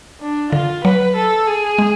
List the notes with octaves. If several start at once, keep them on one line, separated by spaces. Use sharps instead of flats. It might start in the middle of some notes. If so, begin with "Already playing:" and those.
D4
D3 F4
F#3 B4
A4
G#4
G#3